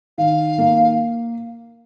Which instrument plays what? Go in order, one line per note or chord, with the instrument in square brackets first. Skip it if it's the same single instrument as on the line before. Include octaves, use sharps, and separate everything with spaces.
[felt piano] D#3 [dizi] F5
[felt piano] A#3